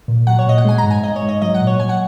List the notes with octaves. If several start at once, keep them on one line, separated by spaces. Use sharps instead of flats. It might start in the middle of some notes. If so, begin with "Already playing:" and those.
A#2
F#3 F#5
C#5
A#2 D#5
F#5
G#3 G#5
A#5
G#2
G#5
G#3 D#5
C#5
G#2
D#5
F#3 D#5
F#5
A#2
C#5
F#3 G#5
F#5